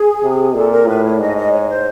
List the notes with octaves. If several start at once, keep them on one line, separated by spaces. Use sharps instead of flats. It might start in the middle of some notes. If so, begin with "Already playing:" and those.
Already playing: G#4
C3
A#2 A4
A#4
A2 B4
C#5
G#2 D#5
D#5
C#5
C5